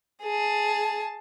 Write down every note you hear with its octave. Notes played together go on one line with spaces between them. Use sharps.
G#4 A5